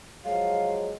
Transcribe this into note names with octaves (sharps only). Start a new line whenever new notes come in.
F3 F#3 G#3 F5